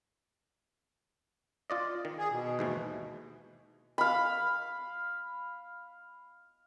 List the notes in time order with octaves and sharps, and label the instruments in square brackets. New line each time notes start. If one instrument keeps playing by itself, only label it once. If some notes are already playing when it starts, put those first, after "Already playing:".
[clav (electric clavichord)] F4 D5 D#5
D#3
[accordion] G#4
B2
[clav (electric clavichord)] D#2 G#2 E3
[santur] F5 B5